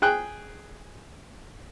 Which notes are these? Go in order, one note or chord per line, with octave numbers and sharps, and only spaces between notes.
G#4 G5 F#6